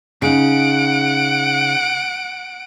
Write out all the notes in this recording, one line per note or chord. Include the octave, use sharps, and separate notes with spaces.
C#3 D#4 F#5 D7